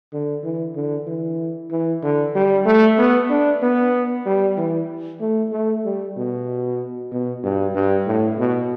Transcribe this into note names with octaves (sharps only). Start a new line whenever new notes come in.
D3
E3
D3
E3
E3
D3
G3
A3
B3
D4
B3
G3
E3
A3
A3
G3
B2
B2
G2
G2
A2
B2